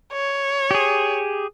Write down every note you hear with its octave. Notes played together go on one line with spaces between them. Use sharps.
C#5
G4 G#4